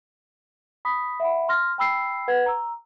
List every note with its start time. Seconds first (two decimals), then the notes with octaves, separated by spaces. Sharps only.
0.85 B5 D#6 B6
1.20 E5 F#5 B5
1.49 C6 F6 A#6
1.78 G5 B5 E6 C7
2.28 B4 F#5 G#6
2.46 A#5 E6